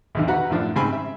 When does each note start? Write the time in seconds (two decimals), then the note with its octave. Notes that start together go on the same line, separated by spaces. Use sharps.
0.15 B1 E2 D3
0.28 F#4 B4 F#5 A#5
0.50 F#2 A2 F3 D4
0.76 G#2 C#3 C4 G#5 B5
0.93 E5